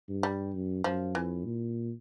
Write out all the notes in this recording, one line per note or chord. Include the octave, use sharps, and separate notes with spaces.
G2
G3
F#2
F#2 F3
F2 E3
A#2